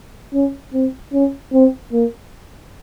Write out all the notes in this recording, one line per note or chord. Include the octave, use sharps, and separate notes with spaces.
C#4
C4
C#4
C4
A#3